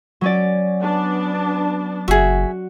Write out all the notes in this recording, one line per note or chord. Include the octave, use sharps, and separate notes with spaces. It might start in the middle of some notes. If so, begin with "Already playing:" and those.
F#3 C#4 D5
B3 D4 A5
F#1 F#4 G#4 E5